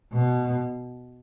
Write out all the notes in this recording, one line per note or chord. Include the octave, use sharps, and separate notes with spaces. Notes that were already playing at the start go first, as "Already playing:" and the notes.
B2